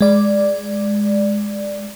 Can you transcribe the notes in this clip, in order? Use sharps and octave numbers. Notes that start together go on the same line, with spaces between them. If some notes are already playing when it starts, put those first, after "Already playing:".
G#3 D5